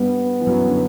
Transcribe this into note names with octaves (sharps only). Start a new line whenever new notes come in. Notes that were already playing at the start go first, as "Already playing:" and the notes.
Already playing: G2 G3 B3
E3
F#2 F#3
D3